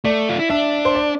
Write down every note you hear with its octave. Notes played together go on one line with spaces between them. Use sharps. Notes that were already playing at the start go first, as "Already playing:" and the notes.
A3 D5
F4
E4
D4 E5
C5
D5